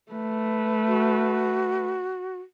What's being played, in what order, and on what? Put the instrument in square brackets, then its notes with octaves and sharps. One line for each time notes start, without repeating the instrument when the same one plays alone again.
[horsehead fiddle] A3 B4
[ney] F#4